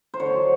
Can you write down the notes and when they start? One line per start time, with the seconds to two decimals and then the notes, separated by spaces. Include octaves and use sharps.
0.14 C5
0.20 D3 C#5
0.35 F#3